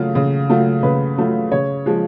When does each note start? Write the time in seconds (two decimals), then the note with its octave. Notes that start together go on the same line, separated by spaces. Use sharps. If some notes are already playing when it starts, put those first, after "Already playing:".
Already playing: C#3 F#3 A3 F4
0.15 C#3
0.49 F#3 A3 F4
0.83 C#3 B4
1.17 F#3 A3 F4
1.52 C#3 C#5
1.86 F3 G#3